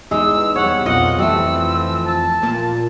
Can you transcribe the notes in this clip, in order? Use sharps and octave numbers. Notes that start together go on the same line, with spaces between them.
E2 G#3 D#4 E6
G3 B3 C#5 F#5
B1 F2 F4 D#5 F#5
E3 F3 G3 A3 E6
A5
A#2